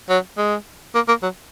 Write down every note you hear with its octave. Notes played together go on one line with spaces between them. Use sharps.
F#3
G#3
A#3
A#3
F#3